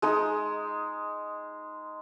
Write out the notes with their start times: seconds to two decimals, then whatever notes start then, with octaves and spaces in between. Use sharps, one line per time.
0.02 G#3 D#4